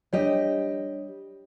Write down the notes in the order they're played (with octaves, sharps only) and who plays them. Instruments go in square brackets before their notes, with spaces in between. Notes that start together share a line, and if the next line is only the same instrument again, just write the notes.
[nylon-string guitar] G3 G4 D#5 [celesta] D4 C#5